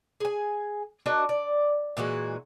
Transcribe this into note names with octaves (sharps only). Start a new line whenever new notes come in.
G#4 G#5
D4 F#4 A#4 D#5
D5
A#2 E3 G#3 F#4